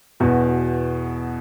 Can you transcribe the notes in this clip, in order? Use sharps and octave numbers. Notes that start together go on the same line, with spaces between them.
E2 B2 F#4